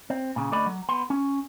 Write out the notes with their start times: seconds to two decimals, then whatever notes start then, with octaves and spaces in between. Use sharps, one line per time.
0.10 C4
0.36 A#2 C#3
0.52 D3 A3 A4 D5 D#5 B5
0.66 F#3
0.89 B3 C6
1.10 C#4